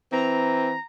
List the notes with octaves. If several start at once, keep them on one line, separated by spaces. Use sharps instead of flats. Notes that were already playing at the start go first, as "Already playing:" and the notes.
E3 C4 A#5